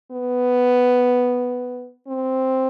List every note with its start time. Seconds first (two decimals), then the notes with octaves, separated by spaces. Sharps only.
0.12 B3
2.08 C4